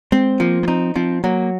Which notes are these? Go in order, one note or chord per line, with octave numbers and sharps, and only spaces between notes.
G#3 C4
F3 A#3
A#3
C4 D#4
F3 C4
F#3 A#3